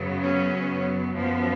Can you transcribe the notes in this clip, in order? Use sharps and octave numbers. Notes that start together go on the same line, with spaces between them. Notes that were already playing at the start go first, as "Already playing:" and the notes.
Already playing: F#2 C#3 F#3 B3
C#4
F#2 F3 B3